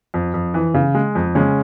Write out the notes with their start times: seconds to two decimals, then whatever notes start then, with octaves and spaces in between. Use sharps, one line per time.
0.14 F2
0.34 F2
0.54 E3
0.74 C#3
0.95 G#3
1.15 F2
1.35 C#3 G#3 C#4